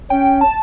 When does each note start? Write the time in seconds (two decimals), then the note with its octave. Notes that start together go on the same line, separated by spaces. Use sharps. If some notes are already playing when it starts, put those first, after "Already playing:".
0.10 C#4 G5
0.41 A5